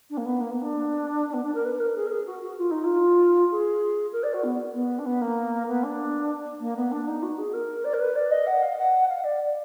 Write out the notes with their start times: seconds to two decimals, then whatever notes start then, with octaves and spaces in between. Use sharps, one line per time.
0.10 D4
0.17 A#3
0.25 B3
0.41 A#3
0.51 B3
0.62 D4
1.28 D4
1.33 B3
1.44 D4
1.54 A#4
1.65 B4
1.80 A#4
1.96 G#4
2.06 A#4
2.11 G#4
2.26 F#4
2.42 F#4
2.58 F4
2.71 D#4
2.84 F4
3.51 G#4
4.13 A#4
4.23 D5
4.33 F#4
4.43 B3
4.74 B3
4.99 D4
5.05 B3
5.21 A#3
5.67 B3
5.83 D4
6.60 A#3
6.76 B3
6.91 D4
7.07 D#4
7.22 F#4
7.38 G#4
7.53 A#4
7.84 D5
7.93 A#4
8.00 B4
8.15 D5
8.31 D#5
8.47 F#5
8.62 F5
8.78 F#5
9.09 F5
9.24 D5